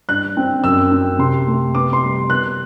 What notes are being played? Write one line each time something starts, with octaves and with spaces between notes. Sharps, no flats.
G2 F#6
C4
F#2 E6
C4
C3 C6
A3
B3 D6
C6
G3
B3 F#6